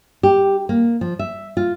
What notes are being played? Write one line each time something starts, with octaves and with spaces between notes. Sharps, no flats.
G4
A#3
F3
E5
F4